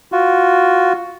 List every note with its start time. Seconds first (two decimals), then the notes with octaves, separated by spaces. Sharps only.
0.12 F4 F#4